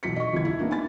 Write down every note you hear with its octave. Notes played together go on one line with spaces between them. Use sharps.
B1 E3 B6 C#7
D#5 C#6
F#1 D#2 E4 G#6
E4
A#3 B3 D4 D#4
G#5 B5 A6